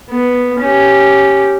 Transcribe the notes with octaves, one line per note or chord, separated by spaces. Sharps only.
B3
C#4 G4